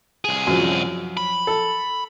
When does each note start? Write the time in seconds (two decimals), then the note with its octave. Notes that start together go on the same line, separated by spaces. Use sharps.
0.25 C2 G#4
0.47 F#2 F3 F#3
1.17 B5
1.47 A4